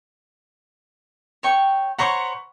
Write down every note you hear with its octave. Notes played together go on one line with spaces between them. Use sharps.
C#5 G5 C#6
C5 C#5 F#5 A#5 B5 C#6